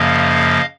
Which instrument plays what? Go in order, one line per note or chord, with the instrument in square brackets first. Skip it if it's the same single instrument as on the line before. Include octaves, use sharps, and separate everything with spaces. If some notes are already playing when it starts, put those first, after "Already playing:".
Already playing: [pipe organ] F#2 C#3 F3 A#3 D#5 F5